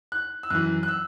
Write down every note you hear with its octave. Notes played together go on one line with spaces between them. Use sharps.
F#6
E6
F#2 E3 F#6
F#6
E6